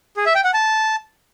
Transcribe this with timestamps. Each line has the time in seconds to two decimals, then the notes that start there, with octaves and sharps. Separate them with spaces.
0.17 G#4
0.26 E5
0.35 G5
0.44 F#5
0.54 A5